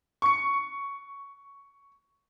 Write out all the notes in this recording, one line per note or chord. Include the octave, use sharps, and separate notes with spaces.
C#6 C#7